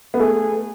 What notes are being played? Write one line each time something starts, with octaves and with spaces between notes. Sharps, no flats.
B3
A3 G#4